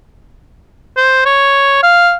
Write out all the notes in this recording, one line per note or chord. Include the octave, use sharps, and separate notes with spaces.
C5
C#5
F5